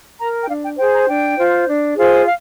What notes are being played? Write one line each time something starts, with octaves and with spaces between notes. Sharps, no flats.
A#4 A#5
G5
D4 F5
G5
G#4 C5 G5
A#5
D4 G5
F4 C5
D4
F4 G#4 C5
F5